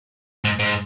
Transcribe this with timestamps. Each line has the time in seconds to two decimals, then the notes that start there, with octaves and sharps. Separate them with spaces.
0.45 G#2
0.59 G#2